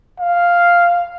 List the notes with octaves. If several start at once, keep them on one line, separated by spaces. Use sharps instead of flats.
F5